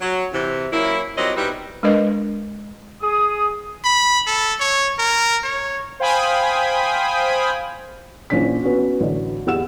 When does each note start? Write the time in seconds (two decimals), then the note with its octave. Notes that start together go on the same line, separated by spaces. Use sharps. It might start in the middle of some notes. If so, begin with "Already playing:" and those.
0.01 F#3
0.33 C3 E3
0.72 F#3 A#3 C#4 E4
1.17 A#2 F#3 G3 C4 D#5
1.37 B2 G3 D#4 E4 G4 B4
1.83 G#3 D4 A#4 B4 D#5
3.01 G#4 D#6
3.84 B5
4.27 A4
4.60 C#5
4.99 A#4
5.44 C#5
6.00 C5 F5 G5 G#5 B5 D#6
8.30 A#1 E3 C#4 D4 B6
8.62 B3 C#4 F#4
9.01 A1 D3 F#4
9.46 E2 G4 F#5 E6 E7